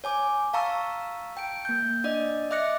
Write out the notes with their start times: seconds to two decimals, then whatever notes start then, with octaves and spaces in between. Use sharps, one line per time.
0.04 C#5 G#5 D6
0.53 F5 A5 A#5 C#6 E6
1.37 G5 D7
1.65 A#3 G6
2.04 D4 D5 D#5
2.51 D#5 E5 D6 F#6 A#6 C#7